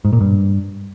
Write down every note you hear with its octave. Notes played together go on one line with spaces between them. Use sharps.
G#2
A#2
G2